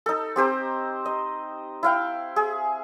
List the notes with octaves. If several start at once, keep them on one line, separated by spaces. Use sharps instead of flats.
D#4 A4
C4 G4 C5 A#5
D#5
E4 F5 G5
G#4